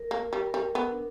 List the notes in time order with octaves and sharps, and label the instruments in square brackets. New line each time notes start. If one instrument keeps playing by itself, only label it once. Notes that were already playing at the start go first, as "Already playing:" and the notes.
Already playing: [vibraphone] A#4
[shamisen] A#3
G3
[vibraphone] A#4
[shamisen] G3
[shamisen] B3 [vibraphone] B4
[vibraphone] D4